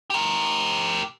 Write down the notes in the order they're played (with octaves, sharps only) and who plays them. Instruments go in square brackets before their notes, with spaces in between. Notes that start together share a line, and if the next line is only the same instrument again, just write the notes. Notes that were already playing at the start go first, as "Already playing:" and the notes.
[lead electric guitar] G4 A#4